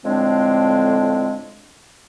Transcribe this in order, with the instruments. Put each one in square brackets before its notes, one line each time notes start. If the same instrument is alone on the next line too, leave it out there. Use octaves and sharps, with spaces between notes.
[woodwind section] A2 D3 F3 G#3 C4 D4